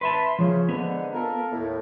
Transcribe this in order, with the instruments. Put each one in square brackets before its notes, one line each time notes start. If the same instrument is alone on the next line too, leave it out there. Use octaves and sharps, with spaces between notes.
[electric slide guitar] B4 E5 A5 [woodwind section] B5 C6
[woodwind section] C#3 [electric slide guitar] F3
[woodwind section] G#2 D3 [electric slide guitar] B3
[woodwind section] F4 A4 A#4
D#2 A2